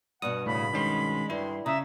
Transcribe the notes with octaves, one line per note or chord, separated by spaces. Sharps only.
G2 B2 F#5 D#6
A2 C#3 B5
D#3 G#3 C#4 C6
D2 G2 D#3 E4 C6
C#3 E5 A#5 D#6